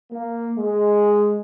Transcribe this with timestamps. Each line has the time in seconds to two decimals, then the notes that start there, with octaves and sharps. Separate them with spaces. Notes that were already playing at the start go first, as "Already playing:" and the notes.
0.12 A#3
0.58 G#3